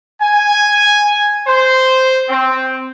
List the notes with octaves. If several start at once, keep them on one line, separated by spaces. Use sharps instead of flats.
G#5
C5
C4